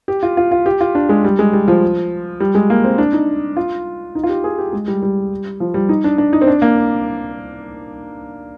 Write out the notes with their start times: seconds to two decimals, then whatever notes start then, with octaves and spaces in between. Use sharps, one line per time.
0.08 G4
0.23 F4
0.37 F4
0.52 F4
0.66 G4
0.81 F4
0.95 D4
1.09 G#3
1.24 G3
1.39 G#3
1.53 G3
1.68 F3
2.40 G3
2.55 G#3
2.70 A#3
2.84 C4
2.98 D4
3.13 D#4
3.57 F4
4.15 D#4
4.23 F4
4.29 G4
4.44 G#4
4.59 G4
4.73 G#3
4.88 G3
5.02 G3
5.60 F3
5.74 G3
5.89 D#4
6.04 D4
6.18 D4
6.33 D#4
6.42 C4
6.48 D4
6.62 A#3